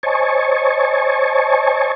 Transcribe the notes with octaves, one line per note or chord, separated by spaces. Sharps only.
C5 C#5 D#5 G#5 A5 C#6